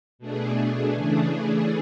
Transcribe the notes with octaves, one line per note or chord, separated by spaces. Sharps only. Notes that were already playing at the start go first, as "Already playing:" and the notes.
B2 A3 D4 G#4
C#3 E3 A3 D4 G#4